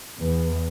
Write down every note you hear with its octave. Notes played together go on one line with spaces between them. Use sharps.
E2